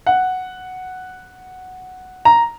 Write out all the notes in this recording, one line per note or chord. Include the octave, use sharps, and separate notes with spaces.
F#5
A#5